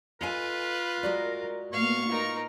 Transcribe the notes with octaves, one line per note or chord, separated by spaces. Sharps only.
F4 A4 B4 D#5 G#5
G#3 F#4 A#4 D5
A2 A#3 B3 F5 C#6
D#4 F4 A#4